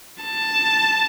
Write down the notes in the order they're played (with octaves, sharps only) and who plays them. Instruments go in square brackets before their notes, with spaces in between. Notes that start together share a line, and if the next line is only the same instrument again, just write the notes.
[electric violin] A5